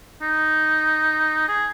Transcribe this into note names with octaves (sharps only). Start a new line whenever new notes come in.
D#4
G#4